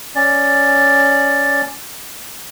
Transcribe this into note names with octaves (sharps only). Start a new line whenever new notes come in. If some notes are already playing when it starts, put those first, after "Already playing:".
C#4 D5